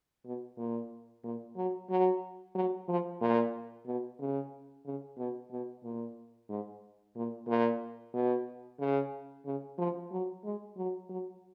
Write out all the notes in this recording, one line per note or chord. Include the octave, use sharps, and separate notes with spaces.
B2
A#2
A#2
F#3
F#3
F#3
F3
A#2
B2
C#3
C#3
B2
B2
A#2
G#2
A#2
A#2
B2
C#3
C#3
F3
F#3
G#3
F#3
F#3